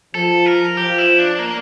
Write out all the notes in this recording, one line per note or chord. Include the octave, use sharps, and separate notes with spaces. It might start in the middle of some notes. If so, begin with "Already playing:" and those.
F3 A4
A#4
F3 G4
E4
D4
A#3